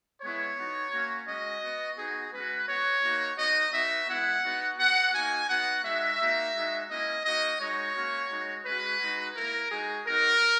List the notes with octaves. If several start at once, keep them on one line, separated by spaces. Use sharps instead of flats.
G#3 B3 E4 C#5
B3 D#4 F#4
A#3 C#4 F#4
G#3 C#4 F#4 D#5
B3 F#4
B3 D#4 F#4 G#4
G#3 C#4 F#4 B4
B3 F#4 C#5
A#3 D#4 F#4
B3 D#4 F#4 D#5
B3 D#4 F#4 E5
G#3 B3 E4 F#5
B3 D#4 F#4
B3 F#4 F#5
A#3 D#4 F#4 G#5
B3 D#4 F#4 F#5
G#3 D#4 F#4 E5
A#3 D#4 F#4
G#3 D#4 F#4
A#3 C#4 E4 D#5
A#3 D#4 F#4 D#5
G#3 D#4 F#4 C#5
A#3 C#4 F#4
G#3 D#4 F#4
G#3 C#4 F#4 B4
G#3 D#4 F#4
A#3 E4 A#4
G#3 D#4 F#4 G#4
B3 D#4 F#4 A#4